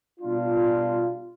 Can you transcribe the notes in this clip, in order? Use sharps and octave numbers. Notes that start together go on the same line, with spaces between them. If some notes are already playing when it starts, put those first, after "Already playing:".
B2 G3 D4 F4